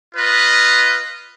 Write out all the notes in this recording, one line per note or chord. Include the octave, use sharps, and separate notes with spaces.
F4 B4 D#5